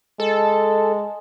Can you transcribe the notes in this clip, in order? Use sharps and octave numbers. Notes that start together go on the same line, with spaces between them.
G#3 A4